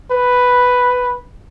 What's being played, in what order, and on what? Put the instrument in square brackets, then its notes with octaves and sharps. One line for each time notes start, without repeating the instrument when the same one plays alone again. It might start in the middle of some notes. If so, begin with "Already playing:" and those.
[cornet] B4